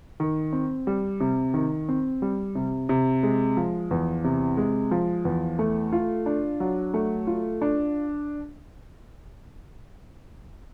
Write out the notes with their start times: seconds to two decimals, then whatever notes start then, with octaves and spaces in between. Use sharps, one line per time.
0.20 D#3
0.53 C4
0.87 G3
1.20 C3
1.54 D#3
1.89 C4
2.22 G3
2.55 C3
2.89 C3
3.23 G#3
3.57 F3
3.91 E2
4.24 C3
4.57 G#3
4.91 F3
5.25 E2
5.59 A3
5.92 F4
6.26 D4
6.60 F#3
6.94 A3
7.27 F4
7.62 D4